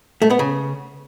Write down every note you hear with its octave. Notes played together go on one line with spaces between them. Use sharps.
A3
B3
C#3